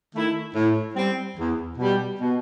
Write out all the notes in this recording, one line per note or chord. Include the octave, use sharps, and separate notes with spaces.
D#3 A3 E4
A2
G3 C4
E2
B2 G3
B2